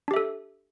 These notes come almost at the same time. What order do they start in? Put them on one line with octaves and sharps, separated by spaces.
D4 G4 E5 A4